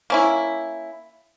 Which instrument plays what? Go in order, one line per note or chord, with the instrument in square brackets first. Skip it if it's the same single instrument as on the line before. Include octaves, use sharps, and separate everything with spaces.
[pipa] A#3 C#4 E4